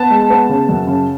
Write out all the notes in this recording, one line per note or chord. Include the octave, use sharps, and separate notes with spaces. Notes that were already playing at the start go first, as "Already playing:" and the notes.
Already playing: B3 A5
G#3
B3
C#3
F#2
C#3